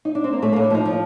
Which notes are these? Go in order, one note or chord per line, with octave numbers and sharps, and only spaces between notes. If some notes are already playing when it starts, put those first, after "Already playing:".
D#4
D4
C4
A#3
A2 A3
A#3
A2
D4
F3 D#4
F3